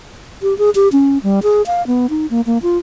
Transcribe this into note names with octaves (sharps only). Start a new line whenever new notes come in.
G4
G#4
G4
C#4
G3
G#4
F5
B3
D#4
A#3
A#3
F4